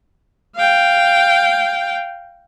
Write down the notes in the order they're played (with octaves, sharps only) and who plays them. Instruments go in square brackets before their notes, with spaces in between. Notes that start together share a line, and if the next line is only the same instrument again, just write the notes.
[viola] F5 G5